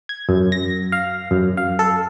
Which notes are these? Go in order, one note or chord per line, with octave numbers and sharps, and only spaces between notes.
G#6
F#2
A#6
F5
F#2
F5
A4